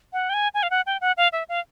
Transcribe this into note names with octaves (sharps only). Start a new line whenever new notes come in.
F#5
G5
G#5
G#5
F5
F#5
G5
F#5
F5
E5
F5